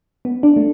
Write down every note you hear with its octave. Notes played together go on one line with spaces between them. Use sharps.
B3
D4
A3